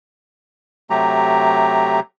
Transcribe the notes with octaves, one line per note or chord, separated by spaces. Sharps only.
C3 F#3 A3 G4 A#5